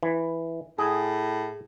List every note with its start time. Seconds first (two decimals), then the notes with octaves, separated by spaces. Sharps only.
0.03 E3
0.78 A2 G#4